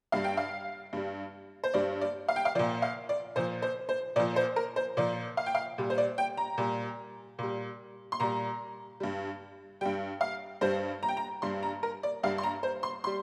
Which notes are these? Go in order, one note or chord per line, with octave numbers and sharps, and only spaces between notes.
G2 G3 F5
G5
F5
G2 G3
C5
G2 G3 D5
D5
F5
G5
F5
A#2 F3 D5
F5
D5
A#2 F3 C5
C5
C5
A#2 F3 D5
C5
A#4
C5
A#2 F3 D5
F5
G5
F5
A#2 G3
C5
D5
G5
A#5
A#2 G3
A#2 G3
C6
A#2 G3 A#5
G2 G3
G2 G3 G5
F5
G2 G3 C5
A#5
G5
A#5
G2 G3 C6
A#5
A#4
D5
G2 G3 F5
C6
A#5
C5
C6
G3 C6